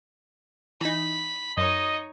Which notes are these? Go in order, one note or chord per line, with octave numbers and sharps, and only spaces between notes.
E3 D#4 B5
F#2 D#4 C#5 D#5